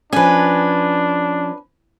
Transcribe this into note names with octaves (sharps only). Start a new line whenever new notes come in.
F3 C#4 D4 B4 G#5